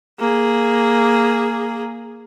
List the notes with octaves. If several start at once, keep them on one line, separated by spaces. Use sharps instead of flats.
A#3 G#4